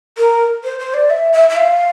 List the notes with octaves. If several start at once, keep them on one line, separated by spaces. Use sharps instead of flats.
A#4
C5
C5
D5
E5
E5
E5
F5